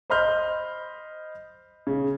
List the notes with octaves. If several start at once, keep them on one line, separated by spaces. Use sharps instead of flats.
C5 D#5 B5 C6 F6 G6
C#3